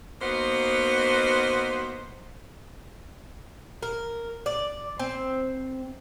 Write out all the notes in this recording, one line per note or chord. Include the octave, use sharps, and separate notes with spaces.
A#3 B3 D#4 F#4 C5
A#4
D5
C4